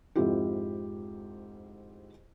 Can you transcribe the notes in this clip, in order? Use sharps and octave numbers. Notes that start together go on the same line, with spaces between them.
F2 G#2 C4 E4 F4 G4